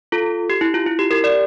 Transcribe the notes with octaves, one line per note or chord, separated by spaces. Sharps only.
F4 A4
G4
E4
F4
E4
G4
G4 A#4
A#4 D5